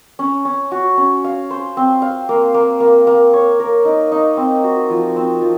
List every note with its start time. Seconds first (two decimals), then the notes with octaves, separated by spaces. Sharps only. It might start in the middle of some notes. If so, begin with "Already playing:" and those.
0.19 C#4
0.45 C#4
0.72 F#4
0.97 C#4
1.24 F5
1.51 C5
1.77 C4
2.02 F5
2.29 A#3
2.54 A#3
2.80 A#3
3.07 A#3
3.33 C#5
3.60 A#4
3.85 D#4
4.12 D#4
4.37 C4
4.64 F#4
4.90 F3
5.16 C4
5.42 F3